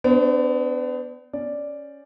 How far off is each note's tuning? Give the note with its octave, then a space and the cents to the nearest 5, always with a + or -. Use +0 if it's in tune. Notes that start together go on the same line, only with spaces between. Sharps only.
B3 +40 D4 +0 C5 +0
C#4 +0 D5 +0